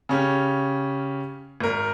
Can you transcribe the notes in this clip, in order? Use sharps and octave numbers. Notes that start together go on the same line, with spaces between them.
C#3 C#4 G4
G#1 A#4